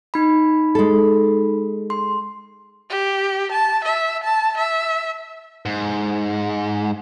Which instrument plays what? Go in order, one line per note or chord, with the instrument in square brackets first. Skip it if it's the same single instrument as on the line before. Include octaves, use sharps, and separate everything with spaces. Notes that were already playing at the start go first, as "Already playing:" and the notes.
[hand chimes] D#4 B5
[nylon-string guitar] G#3 A4
[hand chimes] C6
[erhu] G4
A5
E5
A5
E5
[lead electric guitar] G#2